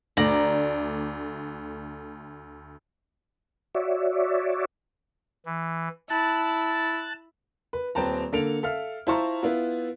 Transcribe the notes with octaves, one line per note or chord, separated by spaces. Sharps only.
D2 A3 D5 A#5
F#4 C#5 D5 E5
E3
E4 A5 F#6 A6
B4
D#1 C4 B4 G5 A5 A#5
D3 A#3 A4 D7 F7
A4 E5 F5 F6
E4 F4 C5 A5 A#5 C#6
B3 E4 F4